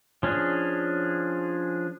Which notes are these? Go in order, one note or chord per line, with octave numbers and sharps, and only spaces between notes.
F3 C#4 D4 G#4